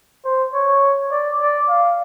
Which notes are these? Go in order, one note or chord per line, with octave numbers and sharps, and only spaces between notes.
C5
C#5
D5
D5
F5